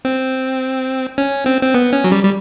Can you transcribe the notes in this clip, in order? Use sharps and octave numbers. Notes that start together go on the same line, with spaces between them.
C4
C#4
C4
C4
B3
C#4
F#3
G3
G3